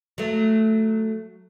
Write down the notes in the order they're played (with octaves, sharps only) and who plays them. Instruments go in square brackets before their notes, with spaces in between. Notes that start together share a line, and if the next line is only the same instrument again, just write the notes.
[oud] F#3 A3